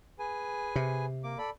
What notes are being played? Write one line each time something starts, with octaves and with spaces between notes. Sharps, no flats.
G#4 B4 G#5
C3
A#3 D6
A4 D5 B5